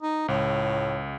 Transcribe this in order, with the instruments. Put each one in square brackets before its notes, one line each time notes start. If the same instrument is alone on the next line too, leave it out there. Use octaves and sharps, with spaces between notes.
[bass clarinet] D#4
[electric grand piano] C#2 [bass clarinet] A2